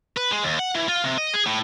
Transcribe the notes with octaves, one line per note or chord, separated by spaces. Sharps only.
B4
G#3
D#2
F#5
E3
F4
C3
D#5
G#4
A2